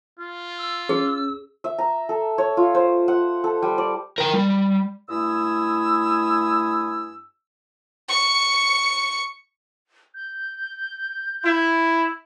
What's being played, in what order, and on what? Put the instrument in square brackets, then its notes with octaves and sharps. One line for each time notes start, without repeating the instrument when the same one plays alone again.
[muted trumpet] F4
[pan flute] E6
[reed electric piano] C#4 [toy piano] G#4
[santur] E5
A#5
A4
C#5
F4
C5
F#5
A4
G3
D5
[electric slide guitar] A#4 G5
G3
[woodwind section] G2 A3 E4 G#5 D#6 E6
[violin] C#6 C#7
[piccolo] G6
[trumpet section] E4